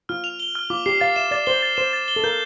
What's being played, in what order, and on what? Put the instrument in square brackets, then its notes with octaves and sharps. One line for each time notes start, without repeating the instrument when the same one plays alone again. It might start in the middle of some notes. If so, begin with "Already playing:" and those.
[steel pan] F4 [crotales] F6
[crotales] F7
G7
F6
[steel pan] F4 [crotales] D6
[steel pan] G4 [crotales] C7
[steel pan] F5 [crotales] A6
[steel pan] E5 [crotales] E7
[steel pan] D5 [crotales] A6
[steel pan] C5 [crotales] G7
[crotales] A6
[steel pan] C5 [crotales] E7
[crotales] A6
G7
[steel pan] A4
[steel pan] A#4 [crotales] G6